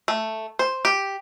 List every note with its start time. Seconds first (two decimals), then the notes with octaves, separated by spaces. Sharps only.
0.08 A3
0.59 C5
0.85 G4